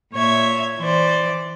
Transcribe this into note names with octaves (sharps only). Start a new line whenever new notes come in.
A#2 C#5 E5 G#6
E3 C5 D5